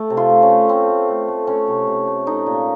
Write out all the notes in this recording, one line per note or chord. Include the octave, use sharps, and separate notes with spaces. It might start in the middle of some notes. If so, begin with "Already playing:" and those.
Already playing: A3
C3
F4
A3
C#4
A3
A3 C4
A3
A3
A3
A3 C#4
C3
C3
A3
A3 D#4
A#2